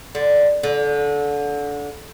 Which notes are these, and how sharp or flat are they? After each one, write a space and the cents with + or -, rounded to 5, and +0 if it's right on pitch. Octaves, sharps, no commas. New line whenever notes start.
D3 +5
D3 -20